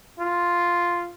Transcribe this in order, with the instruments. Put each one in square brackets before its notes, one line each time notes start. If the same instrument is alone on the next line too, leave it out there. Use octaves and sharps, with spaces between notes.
[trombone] F4